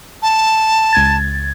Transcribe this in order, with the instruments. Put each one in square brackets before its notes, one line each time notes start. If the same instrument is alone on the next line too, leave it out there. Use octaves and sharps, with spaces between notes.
[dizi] A5
[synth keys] C#2 G#6 A6